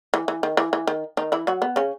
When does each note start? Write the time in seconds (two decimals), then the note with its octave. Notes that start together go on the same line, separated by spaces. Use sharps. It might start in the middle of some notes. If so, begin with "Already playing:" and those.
0.14 E3
0.28 E3
0.43 D#3
0.57 E3
0.73 E3
0.87 D#3
1.17 D#3 D#4
1.32 E3 E4
1.47 F#3 F#4
1.62 B3
1.76 C#3 C#4